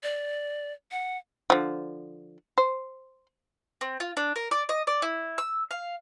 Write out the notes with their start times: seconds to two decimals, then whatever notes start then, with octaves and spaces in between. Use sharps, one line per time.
0.03 D5
0.91 F#5
1.50 D3 F3
2.58 C5
3.81 C4
4.00 F4
4.17 D4
4.36 A#4
4.51 D5
4.69 D#5
4.87 D5
5.02 E4
5.38 E6
5.71 F5